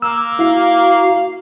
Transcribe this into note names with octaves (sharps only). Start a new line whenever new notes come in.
A#3 E6
E4 F#4 F5